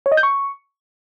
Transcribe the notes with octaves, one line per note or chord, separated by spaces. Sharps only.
C#5
D#5
G6
C#6